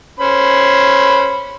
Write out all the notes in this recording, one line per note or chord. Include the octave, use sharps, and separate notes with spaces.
C#4 C5 B5